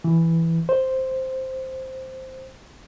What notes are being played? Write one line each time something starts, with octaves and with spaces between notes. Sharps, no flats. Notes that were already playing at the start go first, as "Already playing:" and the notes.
E3
C5